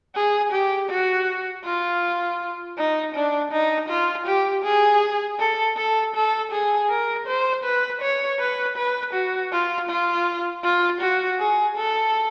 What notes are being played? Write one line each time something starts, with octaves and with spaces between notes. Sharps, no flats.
G#4
G4
F#4
F4
D#4
D4
D#4
F4
G4
G#4
A4
A4
A4
G#4
A#4
C5
B4
C#5
B4
B4
F#4
F4
F4
F4
F#4
G#4
A4